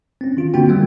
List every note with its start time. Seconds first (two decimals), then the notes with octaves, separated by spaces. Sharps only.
0.21 C4 C#4
0.37 D#3 F4
0.54 D3 A#3 C4 D4 F#4 G5
0.68 F#3 G3 A3 B3 F4